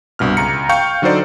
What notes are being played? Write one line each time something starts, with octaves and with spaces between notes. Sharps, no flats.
C2 G2 B2 F6
C#2 A#5 C#7
F5 G5 C#6 F6 G6 C#7
D3 F#3 D#4 A4 C5 D5